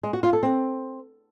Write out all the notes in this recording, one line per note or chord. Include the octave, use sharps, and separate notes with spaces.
G#3
F#4
F4
A4
C4